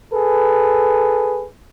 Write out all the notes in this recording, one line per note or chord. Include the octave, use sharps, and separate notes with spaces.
G#4 A4 B4